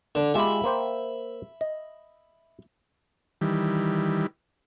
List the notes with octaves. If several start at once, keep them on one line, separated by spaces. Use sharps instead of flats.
D3
G#3 F4 G4 E5 B5
A#3 C5 G5
D#5
D#3 E3 G3